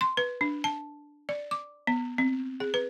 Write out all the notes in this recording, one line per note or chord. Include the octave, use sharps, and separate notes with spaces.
C6
B4
D4
A5
D5
D6
B3
C4
G#4
B4